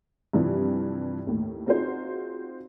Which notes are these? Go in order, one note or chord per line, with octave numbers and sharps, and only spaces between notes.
G2 C3 E3 F3 G3
D#2 A2
C4 D#4 F4 F#4 G#4 C5